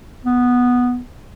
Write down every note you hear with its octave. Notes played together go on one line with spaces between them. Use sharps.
B3